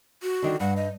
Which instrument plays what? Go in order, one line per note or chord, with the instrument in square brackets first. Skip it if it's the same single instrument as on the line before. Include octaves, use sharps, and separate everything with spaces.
[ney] F#4
[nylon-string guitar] D3 D#3 D4
[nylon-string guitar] G2 [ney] F#5
[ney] D#5